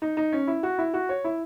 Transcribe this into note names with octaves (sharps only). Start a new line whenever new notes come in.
D#4
D#4
C#4
E4
F#4
E4
F#4
C#5
E4